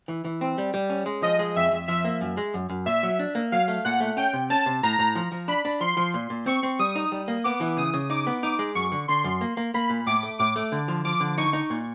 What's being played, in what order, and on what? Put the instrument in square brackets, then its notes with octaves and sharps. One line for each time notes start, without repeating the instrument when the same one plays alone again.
[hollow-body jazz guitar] E3
E3
C4
G3
G3
C#4
G#3
[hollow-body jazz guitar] F3 [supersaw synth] D#5
[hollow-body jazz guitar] G#3
[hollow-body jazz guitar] F2 [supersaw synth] E5
[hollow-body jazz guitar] F2
[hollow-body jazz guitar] F3 [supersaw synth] E5
[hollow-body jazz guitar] A#3
F#2
G#3
F#2
F#2
[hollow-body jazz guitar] A#2 [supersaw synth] E5
[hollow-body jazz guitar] F#3
D4
A#3
[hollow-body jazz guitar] F#3 [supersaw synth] F5
[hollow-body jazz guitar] A3
[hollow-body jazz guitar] A#2 [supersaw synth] F#5
[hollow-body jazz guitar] A3
[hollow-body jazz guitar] C#4 [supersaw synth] G5
[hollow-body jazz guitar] C3
[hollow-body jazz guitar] C#4 [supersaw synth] A5
[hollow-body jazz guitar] C3
[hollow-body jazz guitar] A2 [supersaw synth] A#5
[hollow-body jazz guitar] A2
F3
F3
[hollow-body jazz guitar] D4 [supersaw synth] B5
[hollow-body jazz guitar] D4
[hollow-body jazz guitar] F3 [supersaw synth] C6
[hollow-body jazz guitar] F3
A#2
A#2
[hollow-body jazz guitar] C4 [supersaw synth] C#6
[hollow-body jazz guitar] C4
[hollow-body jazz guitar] G3 [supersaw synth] D#6
[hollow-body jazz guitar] D#4
G3
A#3
[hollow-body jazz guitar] B3 [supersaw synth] D6
[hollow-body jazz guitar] E3
[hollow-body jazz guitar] C#3 [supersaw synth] D#6
[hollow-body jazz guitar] C#3
[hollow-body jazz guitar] D#4 [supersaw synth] D6
[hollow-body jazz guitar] B3
[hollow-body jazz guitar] D#4 [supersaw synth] D6
[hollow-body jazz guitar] G#3
[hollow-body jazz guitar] F#2 [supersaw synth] C#6
[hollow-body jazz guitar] D3
[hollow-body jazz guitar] D3 [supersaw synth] C6
[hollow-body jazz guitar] F#2
A#3
A#3
[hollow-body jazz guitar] A#3 [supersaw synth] B5
[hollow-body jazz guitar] A#2
[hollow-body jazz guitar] A2 [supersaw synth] D6
[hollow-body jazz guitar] A3
[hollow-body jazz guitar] A2 [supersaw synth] D6
[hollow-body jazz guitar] A3
D3
F3
[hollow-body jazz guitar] F3 [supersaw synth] D6
[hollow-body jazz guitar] D3
[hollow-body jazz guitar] D#4 [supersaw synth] C#6
[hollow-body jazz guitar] D#4
A#2